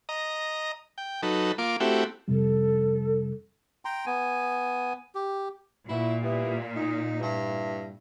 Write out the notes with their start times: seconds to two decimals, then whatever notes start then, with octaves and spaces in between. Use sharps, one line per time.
0.09 D#5 A#5
0.98 G5
1.23 F#3 D#4 A4 B4
1.58 A#3 F4 D6
1.80 A3 C4 E4 F#4 G4
2.28 F2 C3 G3 A4
3.85 G5 A#5 C6
4.06 B3 G#5
5.15 G4
5.89 A#2 E4 F#4
6.23 G3 B3 E4
6.75 D#4
7.20 G2 E4